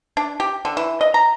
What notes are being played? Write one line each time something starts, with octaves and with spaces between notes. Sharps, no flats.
D4
G4
D3
E3
D#5
A#5